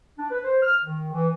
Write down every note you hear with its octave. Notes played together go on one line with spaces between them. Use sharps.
D4
B4
C5
F6
D#3
E3